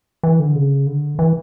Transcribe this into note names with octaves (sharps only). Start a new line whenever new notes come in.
E3
D3
C#3
D3
E3